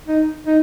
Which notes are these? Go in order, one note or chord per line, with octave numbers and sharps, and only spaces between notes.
D#4
D#4